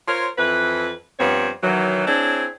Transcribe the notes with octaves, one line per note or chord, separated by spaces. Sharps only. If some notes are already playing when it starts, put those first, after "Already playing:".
F4 A#4 C5 C#5
F2 E3 B4
G2 F3 B3 C4 C#5
D#3 E3 F#3
C4 D4 E4 G#4 C#5